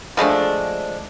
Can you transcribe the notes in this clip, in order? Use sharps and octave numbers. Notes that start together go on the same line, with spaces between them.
F3 G#3 A3 D4